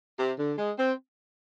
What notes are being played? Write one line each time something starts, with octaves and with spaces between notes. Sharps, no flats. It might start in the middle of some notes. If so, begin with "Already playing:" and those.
C3
D3
G#3
C4